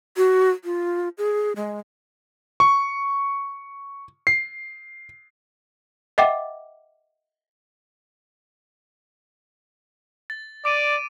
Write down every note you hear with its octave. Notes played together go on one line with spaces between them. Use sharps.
F#4
F4
G#4
G#3
C#6
C7
D#5 E5 F#5 G5 D6
A6
D5 D6 D7 D#7